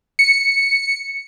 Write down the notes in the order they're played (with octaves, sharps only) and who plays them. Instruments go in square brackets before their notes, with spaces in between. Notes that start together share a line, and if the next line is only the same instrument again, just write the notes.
[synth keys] C#7